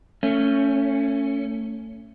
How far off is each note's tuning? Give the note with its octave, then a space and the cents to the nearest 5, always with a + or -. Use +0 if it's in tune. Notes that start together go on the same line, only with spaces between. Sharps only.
A3 +30 C#4 +0